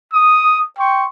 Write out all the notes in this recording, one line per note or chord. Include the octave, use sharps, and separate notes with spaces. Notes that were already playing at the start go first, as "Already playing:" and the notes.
D#6
G5 C6 C#6